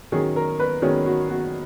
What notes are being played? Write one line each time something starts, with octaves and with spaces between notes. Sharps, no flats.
D#3 F#3 C#4 G#4
A#4
B4
D#3 F#3 C#4 G#4
F#4
F#4